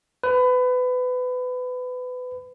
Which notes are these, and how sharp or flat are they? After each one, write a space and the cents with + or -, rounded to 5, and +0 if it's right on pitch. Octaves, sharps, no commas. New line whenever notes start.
B4 +25